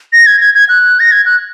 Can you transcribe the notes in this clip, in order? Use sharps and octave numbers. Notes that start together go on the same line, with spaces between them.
A#6
G#6
G#6
G#6
F#6
A#6
G#6
F#6